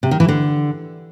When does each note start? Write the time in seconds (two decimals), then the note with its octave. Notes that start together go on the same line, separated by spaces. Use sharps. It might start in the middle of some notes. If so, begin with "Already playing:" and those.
0.03 C3
0.11 D#3
0.20 E3
0.28 D3